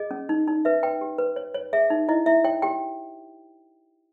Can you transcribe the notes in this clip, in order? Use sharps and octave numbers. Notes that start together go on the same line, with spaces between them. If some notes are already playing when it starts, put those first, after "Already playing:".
Already playing: G#4 D#5
C#4
D#4
D#4
B4 E5
B4 G5
G4
B4
C#5
C#5
G#4 E5
D#4
E4 D#5
E4 E5
C#5 G5
G4 G5